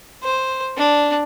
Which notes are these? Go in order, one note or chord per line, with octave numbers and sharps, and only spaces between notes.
C5
D4